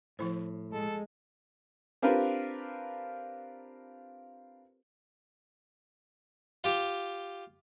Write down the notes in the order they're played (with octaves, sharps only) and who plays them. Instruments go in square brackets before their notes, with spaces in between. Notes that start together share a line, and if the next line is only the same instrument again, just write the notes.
[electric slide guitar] A2 [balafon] F3 E4 C5
[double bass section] G#3 [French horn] A4
[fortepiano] C4 D4 F4 G4 A#4 B4
[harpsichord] F4 G4